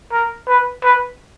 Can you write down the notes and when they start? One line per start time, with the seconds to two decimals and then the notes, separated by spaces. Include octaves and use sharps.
0.12 A#4
0.48 B4
0.83 B4